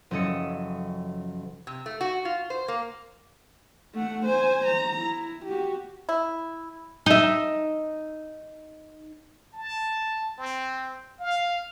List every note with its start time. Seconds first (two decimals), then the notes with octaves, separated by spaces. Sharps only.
0.11 F#1 F3 C#4 A4 D#5 C#7
1.67 C3
1.86 A3
2.01 F#4
2.25 F4
2.50 C5
2.68 A#3
3.95 A3 F#5
4.25 C5 G#5
4.65 A#5
4.99 E4
5.45 F#4 G4
6.09 E4
7.06 D#4 E5
9.53 A5
10.39 C4
11.19 F5